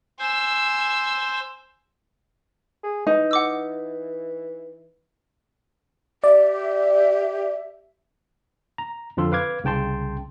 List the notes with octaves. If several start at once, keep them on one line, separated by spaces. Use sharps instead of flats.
C5 G#5 E6
G#4
E3 D#4
F#5 D6 E6
G4 D5 E5
A#5
F2 D3 F3 F4 A4 C6
B4 F5 D6 G#6
C2 C#3 G5 A5 C6